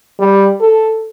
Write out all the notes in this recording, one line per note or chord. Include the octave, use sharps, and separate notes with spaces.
G3
A4